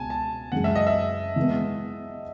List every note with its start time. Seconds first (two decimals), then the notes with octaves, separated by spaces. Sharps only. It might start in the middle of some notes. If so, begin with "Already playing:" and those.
Already playing: C#2 B2 G#3 C#4 G#5 A5
0.10 A5
0.52 F#2 C#3 E3 G#3 F#5
0.64 E5
0.75 D#5
0.87 E5
1.36 E3 G#3 B3